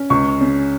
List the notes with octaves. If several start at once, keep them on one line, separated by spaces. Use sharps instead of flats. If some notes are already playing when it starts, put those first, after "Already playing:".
Already playing: C#4
C#2 C#6
C#3